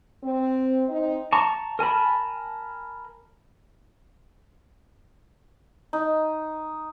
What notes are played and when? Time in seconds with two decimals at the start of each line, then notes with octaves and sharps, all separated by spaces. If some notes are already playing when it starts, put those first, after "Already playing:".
0.24 C4
0.88 C4 D#4
1.33 A5 A#5 C#6
1.79 A#4 G#5 A5 B5
5.93 D#4